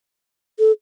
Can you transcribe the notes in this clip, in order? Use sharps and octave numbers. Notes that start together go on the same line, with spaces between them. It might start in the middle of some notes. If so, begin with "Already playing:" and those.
A4